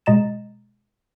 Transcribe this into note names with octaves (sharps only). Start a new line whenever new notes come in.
B2 G#3 D#5 A#5 A6 E7